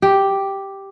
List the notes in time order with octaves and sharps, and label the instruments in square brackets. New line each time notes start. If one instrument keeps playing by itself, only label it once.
[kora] G4